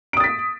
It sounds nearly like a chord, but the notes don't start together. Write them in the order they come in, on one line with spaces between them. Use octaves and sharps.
D7 D#6 A6 B6